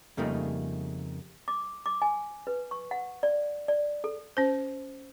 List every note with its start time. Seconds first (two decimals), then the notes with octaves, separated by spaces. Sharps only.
0.17 F2 C#3 G3 A3 A#3 D#4
1.48 D6
1.86 D6
2.02 G#5
2.47 B4
2.71 C#6
2.91 F#5
3.23 D5
3.68 D5
4.04 A4
4.37 C#4 C5